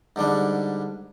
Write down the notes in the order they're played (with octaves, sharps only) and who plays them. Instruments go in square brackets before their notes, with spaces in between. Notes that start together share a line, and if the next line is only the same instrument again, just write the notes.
[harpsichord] G#2 D3 G3 D4